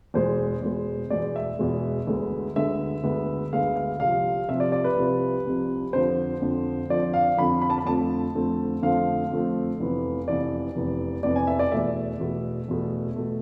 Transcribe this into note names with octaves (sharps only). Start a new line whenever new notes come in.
E2 B2 G#3 C5
E2 B2 G#3
E2 B2 G#3 D5
E5
E2 B2 G#3
D2 D3 G#3 B3
D2 D3 G#3 B3 E5
D2 D3 G#3 B3
D2 D3 G#3 B3 F5
F5
C2 C3 F3 F5
C2 C3 F3 E5
D5
D5
B4
C2 C3 F3
C2 C3 F3
F2 D3 F3 C5
F2 D3 F3
F2 D3 F3 D5
F5
F2 D3 F3 B5
B5
A5
B5
F2 D3 F3 A3 C4 A5
F2 D3 F3 A3 C4
F2 D3 F3 A3 C4 F5
F2 D3 F3 A3 C4
F1 F2 E3 B3
F1 F2 E3 B3 D5
F1 F2 E3 B3
F1 F2 E3 B3 D5
G#5
E5
D5
E2 B2 A3 E5
E2 B2 A3
E2 B2 A3
B2 A3